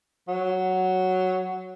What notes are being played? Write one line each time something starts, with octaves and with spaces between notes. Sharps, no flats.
F#3